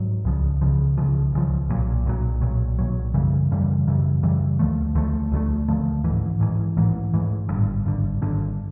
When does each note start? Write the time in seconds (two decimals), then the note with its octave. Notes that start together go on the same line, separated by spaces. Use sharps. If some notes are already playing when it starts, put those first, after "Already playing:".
Already playing: G#2 F#3
0.25 C#2 C#3 F3
0.61 C#2 C#3 F3
0.98 C#2 C#3 F3
1.33 C#2 C#3 F3
1.69 B1 A#2 F#3
2.06 B1 A#2 F#3
2.41 B1 A#2 F#3
2.79 B1 A#2 F#3
3.14 F#2 C#3 E3 G3
3.51 F#2 C#3 E3 G3
3.87 F#2 C#3 E3 G3
4.23 F#2 C#3 E3 G3
4.59 D2 D3 F3 A3
4.95 D2 D3 F3 A3
5.32 D2 D3 F3 A3
5.68 D2 D3 F3 A3
6.04 A1 G#2 E3
6.40 A1 G#2 E3
6.77 A1 G#2 E3
7.14 A1 G#2 E3
7.49 G#1 G2 D3
7.85 G#1 G2 D3
8.22 G#1 G2 D3